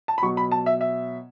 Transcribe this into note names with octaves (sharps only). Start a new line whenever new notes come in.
A5
B5
B2 F#3 C#6
B5
A5
E5
E5